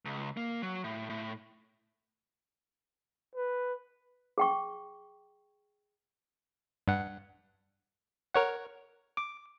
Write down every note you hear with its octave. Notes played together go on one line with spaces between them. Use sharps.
C#2
A#3
F#3
A2
A2
B4
G#4 G5 C#6
G2 F#5
A#4 C#5 F#5
D6